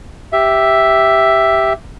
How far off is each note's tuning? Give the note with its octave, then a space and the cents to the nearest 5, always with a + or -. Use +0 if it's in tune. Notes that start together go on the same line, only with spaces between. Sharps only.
G4 +0 E5 +0